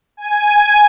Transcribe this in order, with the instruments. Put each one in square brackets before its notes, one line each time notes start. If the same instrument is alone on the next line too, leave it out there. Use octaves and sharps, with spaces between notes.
[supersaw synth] G#5